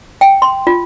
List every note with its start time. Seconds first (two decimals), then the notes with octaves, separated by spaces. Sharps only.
0.21 G5
0.42 C6
0.67 F4